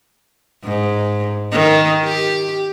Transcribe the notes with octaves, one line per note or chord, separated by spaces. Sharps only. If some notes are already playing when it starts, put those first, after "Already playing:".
G#2
D#3
G4